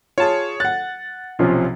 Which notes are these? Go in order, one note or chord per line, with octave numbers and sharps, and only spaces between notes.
F4 G#4 C#5 A5
F#5 F#6 A6
B1 C3 F3 C#4 F4